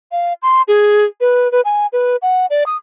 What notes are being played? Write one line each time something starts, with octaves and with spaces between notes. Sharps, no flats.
F5
C6
G#4
B4
B4
G#5
B4
F#5
D5
D#6